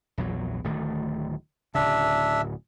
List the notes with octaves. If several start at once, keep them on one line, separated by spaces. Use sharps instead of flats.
A#1 E2 F#3
D1 D#3 A3
D1 C#3 D4 E5